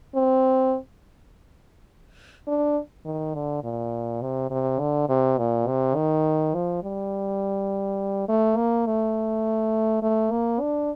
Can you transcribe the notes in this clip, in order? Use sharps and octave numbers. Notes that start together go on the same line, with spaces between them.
C4
D4
D#3
D3
A#2
C3
C3
D3
C3
A#2
C3
D#3
F3
G3
A3
A#3
A3
A3
A#3
D4